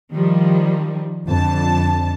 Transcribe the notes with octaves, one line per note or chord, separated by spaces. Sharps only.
D#3 F3 G3
F2 D3 A5